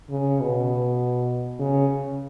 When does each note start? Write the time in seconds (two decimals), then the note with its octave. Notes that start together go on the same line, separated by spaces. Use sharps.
0.10 C#3
0.40 B2
1.59 C#3